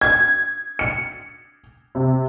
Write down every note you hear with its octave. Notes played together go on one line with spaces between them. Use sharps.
G#6
C#7
C3